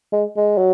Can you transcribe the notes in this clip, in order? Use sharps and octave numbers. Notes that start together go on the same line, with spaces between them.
G#3
G#3
F#3